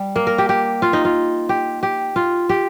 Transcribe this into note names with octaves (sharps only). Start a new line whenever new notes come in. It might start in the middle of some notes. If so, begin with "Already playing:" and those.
Already playing: G3
A#3
A#4
G4
G4
F4
D#4
F4
G4
G4
F4
G4